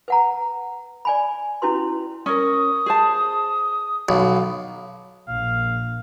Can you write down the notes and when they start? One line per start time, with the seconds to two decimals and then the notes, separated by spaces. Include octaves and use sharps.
0.08 B4 F#5 A#5
1.05 D5 G#5 B5
1.62 C#4 E4 F#4 B4 C6
2.26 C#4 A#4 D#6
2.86 G#4 C5 A5
4.09 B1 F5
5.29 A#1 F5